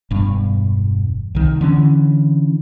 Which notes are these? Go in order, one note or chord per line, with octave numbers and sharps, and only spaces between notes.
E1 G2
C2 D#3
D3 E3 C#4